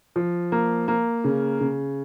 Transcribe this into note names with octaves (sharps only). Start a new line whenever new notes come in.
F3
A#3
A#3
C#3
C#3